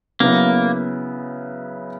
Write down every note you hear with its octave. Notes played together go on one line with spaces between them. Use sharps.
C#3 F#3 A#3 B3 E4